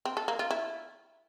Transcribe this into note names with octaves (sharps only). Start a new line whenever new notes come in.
C4
A4
A#3
F4
E4